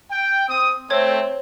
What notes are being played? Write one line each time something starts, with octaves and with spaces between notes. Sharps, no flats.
G5
C4 D#6
A3 C4 C5 C#5 G#6